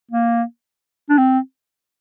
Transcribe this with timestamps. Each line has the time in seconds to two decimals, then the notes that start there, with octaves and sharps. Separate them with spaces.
0.11 A#3
1.10 D4
1.18 C4